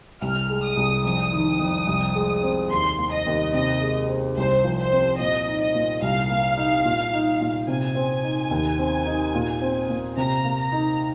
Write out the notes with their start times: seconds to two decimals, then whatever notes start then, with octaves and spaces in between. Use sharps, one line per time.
0.22 C2 F6
0.49 G#3
0.63 D#6
0.77 C2
1.05 F2 D#6
1.32 D#3
1.60 F2
1.87 C2
2.15 G#3
2.43 C4
2.71 D#2 C6
2.98 A#3
3.12 D#5
3.26 D#2
3.53 C3 D#5
3.81 G#3
4.08 C4
4.36 C2 C5
4.64 F3
4.78 C5
4.92 C4
5.19 A#2 D#5
5.47 D#4
5.61 D#5
5.75 A#2
6.02 C2 F5
6.30 A#3
6.57 D#4
6.85 A#2
7.13 D#4
7.40 A#2
7.68 C3 G#5
7.95 C4
8.23 D#4
8.51 D#2
8.79 C4
9.06 D#4
9.35 A#2
9.62 C4
9.89 A#2
10.17 C3 A#5
10.44 A#3
10.59 A#5
10.72 D#4